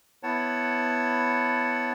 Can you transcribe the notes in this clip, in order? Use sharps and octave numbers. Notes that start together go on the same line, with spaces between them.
B3 E4 C#5 F#5 A5